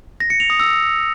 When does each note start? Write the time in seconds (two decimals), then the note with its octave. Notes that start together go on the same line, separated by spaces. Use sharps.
0.20 A#6
0.30 C#7
0.40 F7
0.50 D#6
0.60 E6